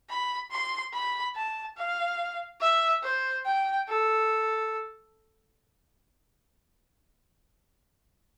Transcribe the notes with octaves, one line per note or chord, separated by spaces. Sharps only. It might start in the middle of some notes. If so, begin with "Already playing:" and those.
B5
C6
B5
A5
F5
E5
C5
G5
A4